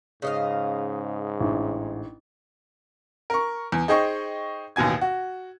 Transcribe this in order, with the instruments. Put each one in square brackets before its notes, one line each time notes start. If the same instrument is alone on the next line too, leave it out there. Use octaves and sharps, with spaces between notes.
[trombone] G#2 [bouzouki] C#3 D#5 F5
[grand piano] A1 [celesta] D4 D#4
[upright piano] A#4 C#6
E2
D#4 G#4 C5 D#5 G5 C#6
A1 D#2 B2 G#5 G#6
F#4